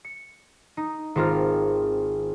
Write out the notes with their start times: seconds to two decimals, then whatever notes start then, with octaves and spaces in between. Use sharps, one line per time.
0.05 C#7
0.77 D#4
1.15 G#1 C4 F4 A#4 F6